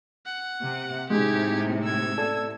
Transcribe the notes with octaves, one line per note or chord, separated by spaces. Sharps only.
F#5
C3
A2 C3 G#3 D#4 G4 G#6
E6 G#6
A4 D5